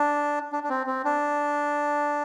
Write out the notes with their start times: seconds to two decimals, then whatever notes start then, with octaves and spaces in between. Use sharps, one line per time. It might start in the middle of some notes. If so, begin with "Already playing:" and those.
Already playing: D4
0.52 D4
0.63 D4
0.69 C4
0.87 C4
1.05 D4